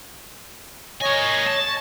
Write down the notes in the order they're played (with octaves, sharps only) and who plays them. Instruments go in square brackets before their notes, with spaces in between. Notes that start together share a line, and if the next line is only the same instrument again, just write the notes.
[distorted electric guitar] A#3 G#5 [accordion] C#5 D#5
[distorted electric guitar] A5